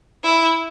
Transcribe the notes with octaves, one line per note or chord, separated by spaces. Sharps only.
E4